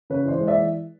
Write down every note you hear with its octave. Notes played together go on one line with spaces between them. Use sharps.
C#3 B4 C#5
E3 C5 D5
G#3
E3 D5 E5